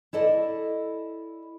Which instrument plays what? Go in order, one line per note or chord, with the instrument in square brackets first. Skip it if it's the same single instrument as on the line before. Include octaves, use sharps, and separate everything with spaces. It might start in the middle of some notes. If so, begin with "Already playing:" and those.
[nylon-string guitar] E4 A4 D5 D#5